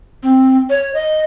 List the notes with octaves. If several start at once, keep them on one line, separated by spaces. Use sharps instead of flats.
C4
C#5
D#5